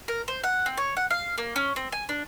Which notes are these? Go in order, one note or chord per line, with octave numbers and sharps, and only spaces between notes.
A#4
C5
F#5
C4
C#5
F#5
F5
A#3
C#4
C4
G#5
D4